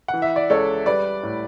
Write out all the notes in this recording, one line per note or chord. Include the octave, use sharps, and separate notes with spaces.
F#5
E3
E5
D5
C#2 A4 C#5
G3 B4 D5
A2